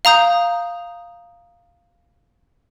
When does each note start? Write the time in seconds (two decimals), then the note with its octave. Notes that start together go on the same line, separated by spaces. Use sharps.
0.05 F5 A#5 D#6 G6